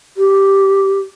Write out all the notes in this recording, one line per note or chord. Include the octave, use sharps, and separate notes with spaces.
G4